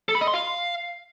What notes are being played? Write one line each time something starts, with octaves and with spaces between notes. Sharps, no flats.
A4
B5
D#5
C6
F5